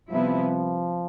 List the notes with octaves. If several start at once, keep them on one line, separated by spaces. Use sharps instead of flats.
C3 F3 G3 B3 E4